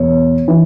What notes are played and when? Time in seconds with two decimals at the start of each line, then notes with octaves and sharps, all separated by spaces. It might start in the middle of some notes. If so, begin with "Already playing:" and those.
Already playing: E2 B2 C#5
0.48 E3